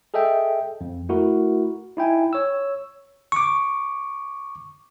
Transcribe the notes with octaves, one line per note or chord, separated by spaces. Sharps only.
G#4 A4 D#5 E5 G5
F2
A3 E4 F#4 A#4
D#4 E4 G5 G#5
C#5 E6
C#6 D6